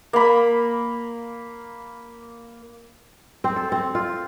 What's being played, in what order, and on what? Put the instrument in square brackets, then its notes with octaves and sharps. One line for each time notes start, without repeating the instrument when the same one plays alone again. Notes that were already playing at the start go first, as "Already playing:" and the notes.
[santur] A#3 B5
[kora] C4
A4
C4
F4